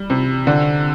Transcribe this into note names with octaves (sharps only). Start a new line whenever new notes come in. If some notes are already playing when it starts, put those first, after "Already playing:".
Already playing: G3
C3
D3